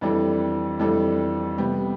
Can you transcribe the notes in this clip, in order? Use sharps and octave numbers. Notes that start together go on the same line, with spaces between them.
F2 E3 G3 D4 A4
F2 E3 G3 D4 A4
C3 G3 B3